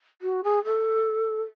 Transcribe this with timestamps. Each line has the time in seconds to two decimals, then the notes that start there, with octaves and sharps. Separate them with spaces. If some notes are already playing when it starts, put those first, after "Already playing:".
0.22 F#4
0.44 G#4
0.64 A4